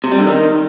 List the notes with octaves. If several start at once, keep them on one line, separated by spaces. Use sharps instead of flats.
C3
G3
D3
D#3